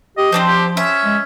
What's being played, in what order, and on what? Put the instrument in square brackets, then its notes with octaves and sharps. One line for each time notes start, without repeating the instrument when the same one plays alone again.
[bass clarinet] G4 [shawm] D#5
[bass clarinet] F3 [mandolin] C4 D4 C5
[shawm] G4
[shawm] C#4 [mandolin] E5
[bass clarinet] G#3